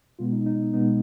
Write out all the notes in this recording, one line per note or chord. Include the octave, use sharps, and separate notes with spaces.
B2 G#3 B3 F4
D#4
D#4
B2 G#3 B3 D#4